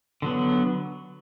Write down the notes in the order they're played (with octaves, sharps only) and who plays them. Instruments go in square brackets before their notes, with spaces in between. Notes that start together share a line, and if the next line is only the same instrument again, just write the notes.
[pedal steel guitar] D3 F#3 B3